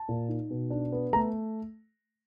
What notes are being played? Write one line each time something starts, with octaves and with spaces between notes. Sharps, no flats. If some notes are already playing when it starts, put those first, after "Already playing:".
Already playing: A5
A#2
D#4
B2
D4
B3
A3 A#5